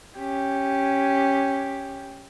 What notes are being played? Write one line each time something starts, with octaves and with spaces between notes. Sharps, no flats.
C#4 G4